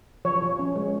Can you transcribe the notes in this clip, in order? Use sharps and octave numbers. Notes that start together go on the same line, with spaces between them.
F3 C#5
F3
C#4
G#3